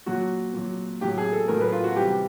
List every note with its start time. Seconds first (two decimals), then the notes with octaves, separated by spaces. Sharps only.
0.06 A#2 F#3 F#4
0.54 A#2 F#3
1.01 A2 F#3 G4
1.18 G#4
1.33 A4
1.48 A2 F#3 A#4
1.61 B4
1.72 F4
1.84 F#4
1.96 C3 E3 G3 G4